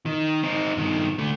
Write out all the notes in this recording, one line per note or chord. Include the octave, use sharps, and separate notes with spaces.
D#3
C4 D#4
G2 D#3
D3 A3